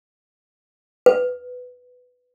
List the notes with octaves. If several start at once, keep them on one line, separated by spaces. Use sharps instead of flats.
B4